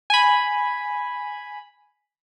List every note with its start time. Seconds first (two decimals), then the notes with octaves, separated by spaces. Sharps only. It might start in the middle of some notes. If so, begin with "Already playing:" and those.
0.10 G#5 B5